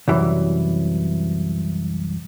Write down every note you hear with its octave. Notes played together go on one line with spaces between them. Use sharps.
C2 F#2 E3